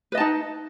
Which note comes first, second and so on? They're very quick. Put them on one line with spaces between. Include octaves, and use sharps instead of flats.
B4 D#5 A5 D#4